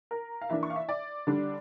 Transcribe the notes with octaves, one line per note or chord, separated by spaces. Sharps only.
A#4
F5
E3 A#3 D4 E5
C#6
F5
E5
D5
D3 G3 D4